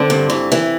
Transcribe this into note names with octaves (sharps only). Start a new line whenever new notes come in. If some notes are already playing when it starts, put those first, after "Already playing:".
Already playing: D3 C4
G2
E3
E3